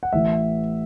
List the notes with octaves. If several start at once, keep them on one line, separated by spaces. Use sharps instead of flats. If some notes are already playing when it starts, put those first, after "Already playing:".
F#5
A1 A2 E3 E5